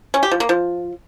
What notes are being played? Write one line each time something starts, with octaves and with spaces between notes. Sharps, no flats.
C#4
G4
F3
A#3
F3